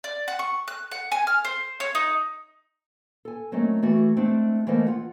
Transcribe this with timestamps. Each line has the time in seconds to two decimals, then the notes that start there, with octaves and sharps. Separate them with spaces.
0.04 D5
0.28 F#5
0.39 C#6
0.68 F#6
0.91 F#5
1.12 G#5
1.27 F6
1.45 C5
1.80 C#5
1.95 D#4
3.25 A4 G#5
3.52 F#3 A3 A#3 C4 C#4 D#5
3.83 E3 A3 F#4
4.17 G#3 A3 C4 D4
4.67 E3 F3 A3 A#3 C5 D#5
4.87 F4 F#5